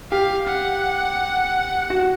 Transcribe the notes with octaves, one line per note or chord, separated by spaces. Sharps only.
G4 F5
F#5
F#4